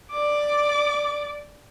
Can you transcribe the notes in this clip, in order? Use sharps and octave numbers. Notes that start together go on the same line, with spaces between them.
D5 D6